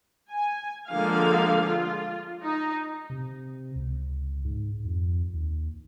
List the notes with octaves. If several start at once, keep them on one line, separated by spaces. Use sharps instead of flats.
G#5
D3 F3 G#3 A#3 F5
F4
D#4
C3
C#2
G#2
F2
D#2